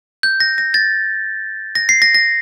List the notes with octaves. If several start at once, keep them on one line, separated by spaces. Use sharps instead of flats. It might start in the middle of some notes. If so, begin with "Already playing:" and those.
G6
A#6
A#6
A6
A#6
C7
A#6
A#6